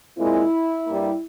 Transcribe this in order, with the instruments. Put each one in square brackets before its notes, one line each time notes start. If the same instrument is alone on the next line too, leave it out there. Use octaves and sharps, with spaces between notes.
[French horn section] A#2 G#3 C4 E4
G2 G3 A#3